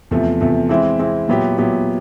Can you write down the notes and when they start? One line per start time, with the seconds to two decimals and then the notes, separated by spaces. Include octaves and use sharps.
0.11 E2 C3 F3 A3
0.41 E2 C3 F3 A3
0.69 E3 G#3 C4 E4
0.99 E3 G#3 C4 E4
1.28 A#2 F#3 B3 E4 G4
1.58 A#2 F#3 B3 E4 G4